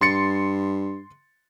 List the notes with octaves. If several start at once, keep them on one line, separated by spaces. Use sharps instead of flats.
G2 C6 A6 C#7